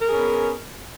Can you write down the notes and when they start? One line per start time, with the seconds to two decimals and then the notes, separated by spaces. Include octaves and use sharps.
0.02 A#4
0.07 G#4
0.12 C#4
0.17 B3